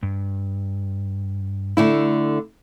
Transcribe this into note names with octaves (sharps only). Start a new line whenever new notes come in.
G2
D3 A3 E4